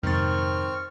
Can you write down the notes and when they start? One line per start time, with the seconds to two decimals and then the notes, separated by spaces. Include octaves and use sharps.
0.03 F2 G#2 C3 D#3 C4 C#6 F6 A6